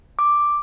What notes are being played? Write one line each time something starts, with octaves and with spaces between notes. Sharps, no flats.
D6